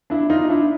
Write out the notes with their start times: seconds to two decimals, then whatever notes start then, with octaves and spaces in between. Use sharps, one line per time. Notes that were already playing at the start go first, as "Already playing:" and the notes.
0.10 D4 E4
0.30 D#4 F4
0.50 D4 E4